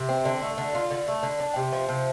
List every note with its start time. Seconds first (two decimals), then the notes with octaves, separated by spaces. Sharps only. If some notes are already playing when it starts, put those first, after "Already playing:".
Already playing: C3
0.09 C4
0.25 D3
0.42 A3
0.58 D3
0.75 F4
0.90 D3
1.08 A3
1.23 D3
1.40 D4
1.56 C3
1.73 F3
1.88 C3